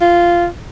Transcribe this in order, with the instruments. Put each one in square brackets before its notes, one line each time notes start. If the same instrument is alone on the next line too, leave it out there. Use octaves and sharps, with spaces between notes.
[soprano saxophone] F4